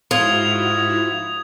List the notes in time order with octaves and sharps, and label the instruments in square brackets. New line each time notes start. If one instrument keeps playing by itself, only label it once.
[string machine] G#2 E4 F#4 [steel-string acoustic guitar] F3 [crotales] D#6 G#6 F7